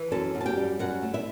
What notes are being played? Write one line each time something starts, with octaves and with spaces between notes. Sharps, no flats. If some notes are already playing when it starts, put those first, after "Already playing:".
Already playing: E3
F#2 A4 A5
F#2
A5
G4 G5
G3
F#2 F#4 F#5
A3
E4 E5